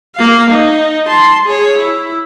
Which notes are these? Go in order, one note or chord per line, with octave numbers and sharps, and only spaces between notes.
A#3 F5
D#4
A5 C6
G#4 C#5
E4